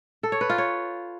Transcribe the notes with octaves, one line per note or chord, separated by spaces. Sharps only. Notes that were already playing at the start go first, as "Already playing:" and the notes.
A4
C#5
B4
F4
C#5